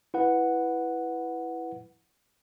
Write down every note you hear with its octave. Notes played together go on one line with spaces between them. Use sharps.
E4 B4 F#5